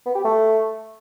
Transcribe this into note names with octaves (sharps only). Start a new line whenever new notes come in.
B3
G4
A3